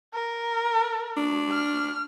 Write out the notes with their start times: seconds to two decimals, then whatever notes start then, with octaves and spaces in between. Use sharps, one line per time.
0.14 A#4
1.17 D4
1.52 F6